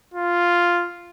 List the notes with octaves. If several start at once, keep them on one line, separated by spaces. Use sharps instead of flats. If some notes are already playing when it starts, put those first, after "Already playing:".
F4